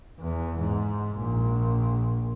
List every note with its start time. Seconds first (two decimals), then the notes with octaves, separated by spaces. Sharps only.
0.20 E2
0.60 G#2
1.18 A#1